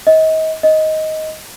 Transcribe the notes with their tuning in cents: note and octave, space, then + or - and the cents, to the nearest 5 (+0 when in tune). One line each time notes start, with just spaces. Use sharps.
D#5 +35
D#5 +10